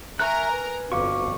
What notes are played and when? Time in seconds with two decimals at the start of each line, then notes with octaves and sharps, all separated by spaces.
0.19 A#4 E5 G#5 A#5 C#6 F#6
0.51 B4
0.92 G1 F2 F#4 F5 C#6 D6